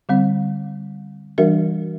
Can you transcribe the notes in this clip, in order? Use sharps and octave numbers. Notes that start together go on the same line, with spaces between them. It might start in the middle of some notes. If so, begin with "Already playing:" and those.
D3 G3 C4
E3 G3 D4 F#4 A#4 E5